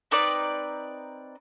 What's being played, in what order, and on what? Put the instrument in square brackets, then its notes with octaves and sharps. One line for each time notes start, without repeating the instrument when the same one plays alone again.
[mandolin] C4 D#4 B4 D5